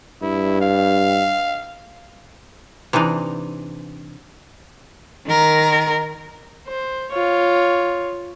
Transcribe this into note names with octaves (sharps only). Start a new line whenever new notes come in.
G2 E4
F5
C3 E3 D4 D#4 D5
D#3 A#4
C5
F4 C#5